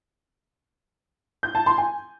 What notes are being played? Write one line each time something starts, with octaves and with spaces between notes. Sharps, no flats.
G6
A5
C6
G#5